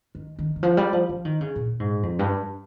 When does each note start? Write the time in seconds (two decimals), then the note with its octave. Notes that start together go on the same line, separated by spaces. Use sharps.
0.15 D#3
0.39 D#3
0.56 D#3
0.63 F3
0.77 G3
0.93 F3
1.09 F3
1.25 D#3
1.41 C#3
1.56 A#2
1.80 G#2
2.03 F2
2.19 G2